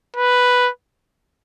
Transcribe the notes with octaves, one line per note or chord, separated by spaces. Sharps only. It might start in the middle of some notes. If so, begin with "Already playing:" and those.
B4